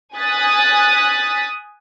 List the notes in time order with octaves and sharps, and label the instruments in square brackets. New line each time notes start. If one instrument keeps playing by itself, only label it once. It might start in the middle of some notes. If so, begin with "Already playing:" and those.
[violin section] G#5 D#6 F#6 A6 B6